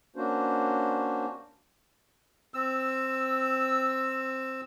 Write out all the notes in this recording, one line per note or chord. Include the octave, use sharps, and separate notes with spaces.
A#3 C#4 D4 F#4 C5
C4 E6